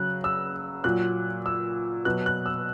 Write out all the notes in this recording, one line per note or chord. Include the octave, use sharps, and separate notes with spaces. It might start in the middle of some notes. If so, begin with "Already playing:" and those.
Already playing: C#3 F#3 F#6
E6
A#2 F#3 F#6
E6
B2 F#3 F#6
F#6
E6